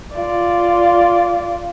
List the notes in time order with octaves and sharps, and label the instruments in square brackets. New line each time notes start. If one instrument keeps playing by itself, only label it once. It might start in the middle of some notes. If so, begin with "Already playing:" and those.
[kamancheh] F4 D5